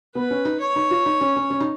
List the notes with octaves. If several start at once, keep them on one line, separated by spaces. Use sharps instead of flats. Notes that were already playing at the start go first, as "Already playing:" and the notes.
B3 B4
C#4
D#4
C#5
D#4
F4
D#4
C#4
C#4
C#4
D#4